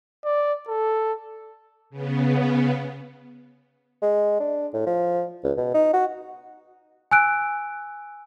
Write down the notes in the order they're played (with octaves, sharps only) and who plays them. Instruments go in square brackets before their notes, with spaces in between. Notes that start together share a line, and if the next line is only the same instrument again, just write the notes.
[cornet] D5
A4
[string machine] C#3 B3
[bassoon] G#3
D4
A2
F3
C#2
B2
D#4
F#4
[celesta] G#5 E6 F#6 D7